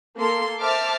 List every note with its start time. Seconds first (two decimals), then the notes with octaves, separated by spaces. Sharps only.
0.17 A#3 A4 C6
0.60 C5 E5 A5 D6 F6